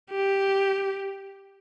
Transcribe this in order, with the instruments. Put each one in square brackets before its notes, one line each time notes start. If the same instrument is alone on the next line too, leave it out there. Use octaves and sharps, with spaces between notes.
[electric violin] G4